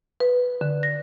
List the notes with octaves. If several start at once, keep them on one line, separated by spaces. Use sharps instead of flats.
B4
D3
A#6